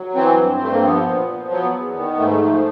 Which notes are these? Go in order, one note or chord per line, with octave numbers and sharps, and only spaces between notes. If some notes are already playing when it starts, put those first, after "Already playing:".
Already playing: F#3
E3 C4
G2
G2 A3
A#3
F3 B3
A#2
F3
F#3 B3
E2
D#3
G#2 A3
F3